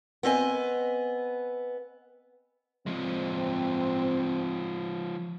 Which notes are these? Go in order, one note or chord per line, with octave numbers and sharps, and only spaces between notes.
B3 C4 D#5 G#5
F3 G#3 C4